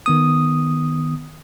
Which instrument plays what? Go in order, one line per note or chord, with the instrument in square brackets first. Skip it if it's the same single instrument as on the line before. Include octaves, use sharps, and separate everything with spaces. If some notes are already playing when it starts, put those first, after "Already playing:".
[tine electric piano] D#3 B3 D#6